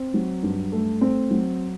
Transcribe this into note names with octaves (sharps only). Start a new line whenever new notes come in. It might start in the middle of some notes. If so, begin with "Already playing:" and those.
Already playing: C4
F#3
G2
A3
C4
F#3